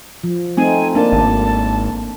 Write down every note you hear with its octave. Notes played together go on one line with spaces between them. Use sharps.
F3
A3 C4 D#4 G#5
A#3 D4 A5
G#1